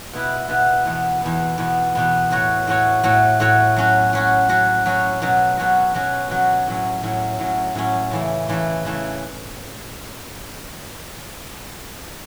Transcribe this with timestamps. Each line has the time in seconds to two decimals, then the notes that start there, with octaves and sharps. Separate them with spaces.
0.13 B2 B3 E4 B4
0.48 B2 B3 E4 B4
0.85 E2 B2 B3
1.21 E2 B2 B3
1.58 E2 B2 B3
1.95 E2 B2 B3
2.30 A2 A3 F#4 C#5
2.67 A2 A3 F#4 C#5
3.04 A2 A3 F#4 C#5
3.40 A2 A3 F#4 C#5
3.76 F#3 C#4 F#4
4.13 F#3 C#4 F#4
4.49 F#3 C#4 F#4
4.86 F#3 C#4 F#4
5.22 B2 F#3 C#4 F#4
5.57 B2 F#3 C#4 F#4
5.94 B2 F#3 C#4 F#4
6.29 B2 F#3 C#4 F#4
6.67 A2 F#3 C#4
7.03 A2 F#3 C#4
7.39 A2 F#3 C#4
7.75 A2 F#3 C#4
8.11 C#3 E3 A3
8.49 C#3 E3 A3
8.85 C#3 E3 A3